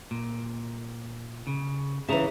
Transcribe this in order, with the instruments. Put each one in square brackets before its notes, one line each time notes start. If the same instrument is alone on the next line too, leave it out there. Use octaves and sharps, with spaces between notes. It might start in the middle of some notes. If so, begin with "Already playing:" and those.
[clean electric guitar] A#2
C#3
[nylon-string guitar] C#3 E3 [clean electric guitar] E5 A#5